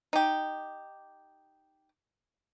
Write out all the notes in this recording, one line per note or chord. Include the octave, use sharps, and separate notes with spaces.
D#4 G4